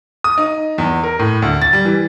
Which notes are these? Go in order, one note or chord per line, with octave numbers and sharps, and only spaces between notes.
D#6
D#4
E2
A#4
A2
D2
A6
G3
E3